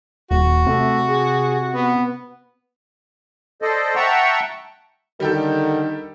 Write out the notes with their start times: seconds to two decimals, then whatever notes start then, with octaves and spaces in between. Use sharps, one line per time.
0.31 D#1 F#4
0.67 C3 A3
1.09 G#4
1.74 B3
3.62 A4 C5 D5 D#5
3.96 E5 F#5 G5 A5 A#5 C#6
5.20 D3 D#3 G3 G4 A4